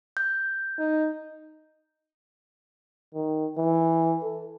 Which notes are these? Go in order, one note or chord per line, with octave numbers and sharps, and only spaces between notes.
G6
D#4
D#3
E3
A4